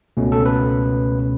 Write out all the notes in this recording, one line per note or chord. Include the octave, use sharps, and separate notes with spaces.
C#2 B2 A3 C#4
A4
B4